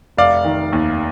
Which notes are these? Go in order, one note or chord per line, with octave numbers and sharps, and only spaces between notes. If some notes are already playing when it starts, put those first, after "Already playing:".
F1 D5 F5
D#3
D#2